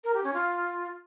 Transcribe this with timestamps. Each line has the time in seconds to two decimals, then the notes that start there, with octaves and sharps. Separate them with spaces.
0.04 A#4
0.14 G4
0.24 C#4
0.34 F4